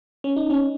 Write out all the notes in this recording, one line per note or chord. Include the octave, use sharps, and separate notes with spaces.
C#4
D#4
C#4